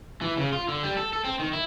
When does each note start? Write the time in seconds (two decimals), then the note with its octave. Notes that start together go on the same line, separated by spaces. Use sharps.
0.21 E3
0.37 C#3
0.52 F4
0.68 D3
0.83 G3
0.97 A4
1.13 A4
1.24 C4
1.40 D#3
1.53 E4